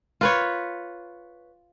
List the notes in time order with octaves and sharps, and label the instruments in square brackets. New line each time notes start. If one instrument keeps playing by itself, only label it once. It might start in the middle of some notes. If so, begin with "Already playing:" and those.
[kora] F4 B4 C#5